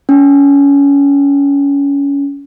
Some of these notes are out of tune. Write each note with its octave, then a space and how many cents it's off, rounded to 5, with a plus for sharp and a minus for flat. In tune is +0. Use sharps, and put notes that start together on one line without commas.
C#4 +25